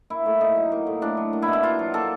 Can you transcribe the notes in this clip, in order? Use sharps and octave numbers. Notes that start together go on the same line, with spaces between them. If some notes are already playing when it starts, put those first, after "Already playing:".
A#3 E4
A2
A2 D#4
F#3
A#3
A2
A2 D4
F#3
A#3
E4
B2
E4
B2 F4
F#3
A#3 A4